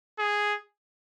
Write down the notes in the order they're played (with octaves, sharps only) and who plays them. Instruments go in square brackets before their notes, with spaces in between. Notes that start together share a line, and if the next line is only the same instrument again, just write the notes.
[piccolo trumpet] G#4